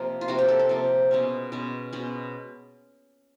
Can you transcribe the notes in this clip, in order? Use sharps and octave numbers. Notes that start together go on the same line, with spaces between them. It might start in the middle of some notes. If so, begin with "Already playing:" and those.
Already playing: C3 F3 A#3
F4
C3 F3 A#3 F#4
G4
A4
A4
C3 F3 A#3
B2 G#3 C#4
B2 G#3 C#4
B2 G#3 C#4